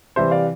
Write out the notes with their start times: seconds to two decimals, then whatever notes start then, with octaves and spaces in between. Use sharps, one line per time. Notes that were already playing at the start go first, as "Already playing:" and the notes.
0.16 C3 E3 G3 C5 E5
0.31 D5 F5